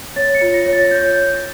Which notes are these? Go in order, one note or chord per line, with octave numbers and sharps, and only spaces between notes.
C#5 A6
C#7
F4
A#6
C#5
A6
C#5 G6